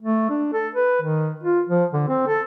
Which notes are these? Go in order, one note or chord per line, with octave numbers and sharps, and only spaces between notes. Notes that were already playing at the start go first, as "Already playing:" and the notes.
A3
D4
A4
B4
D#3
F4
F3
D3
C4
A4